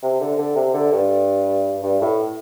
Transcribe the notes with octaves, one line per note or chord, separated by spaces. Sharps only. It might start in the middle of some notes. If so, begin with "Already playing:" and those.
C3
D3
D3
C3
D3
G2
G2
A2